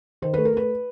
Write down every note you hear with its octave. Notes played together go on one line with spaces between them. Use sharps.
D#3 C5
A3 B4
A#4
A3 B4